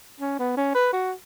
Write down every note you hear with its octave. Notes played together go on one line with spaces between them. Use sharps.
C#4
B3
C#4
B4
F#4